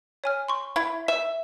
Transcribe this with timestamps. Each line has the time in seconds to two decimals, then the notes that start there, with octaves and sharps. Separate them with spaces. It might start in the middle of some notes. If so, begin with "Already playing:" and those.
0.24 C#5 G#5 F6
0.49 C6 C#6
0.76 E4
1.08 E5 E7